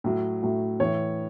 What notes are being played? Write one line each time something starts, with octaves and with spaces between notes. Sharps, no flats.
A2 F#3
A2 F#3
A2 E3 C#5